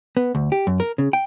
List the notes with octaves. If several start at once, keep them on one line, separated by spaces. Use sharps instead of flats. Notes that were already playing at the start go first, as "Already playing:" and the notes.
B3
D2
G4
F#2
A#4
C#3
G5